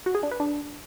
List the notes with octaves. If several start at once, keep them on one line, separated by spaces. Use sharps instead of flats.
F#4
G#4
D4
B4
D4